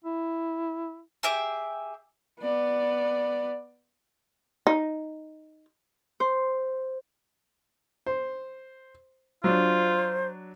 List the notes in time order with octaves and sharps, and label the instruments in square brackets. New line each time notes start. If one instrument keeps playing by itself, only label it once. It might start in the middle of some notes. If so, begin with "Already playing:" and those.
[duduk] E4
[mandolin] G4 G#4 E5 D6
[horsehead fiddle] B3 D5
[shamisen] D#4
[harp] C5
[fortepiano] C5
[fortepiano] F#3 D4 [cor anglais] F4 [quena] C5